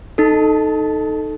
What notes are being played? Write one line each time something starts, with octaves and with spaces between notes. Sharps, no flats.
D#4 A4